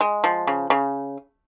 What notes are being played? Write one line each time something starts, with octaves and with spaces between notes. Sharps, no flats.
G#3
F3
C#3
C#3